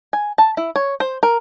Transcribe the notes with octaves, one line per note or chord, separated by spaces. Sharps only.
G#5
A5
E4
C#5
C5
A#4